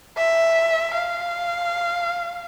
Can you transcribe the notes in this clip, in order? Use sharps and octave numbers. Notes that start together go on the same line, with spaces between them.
E5
F5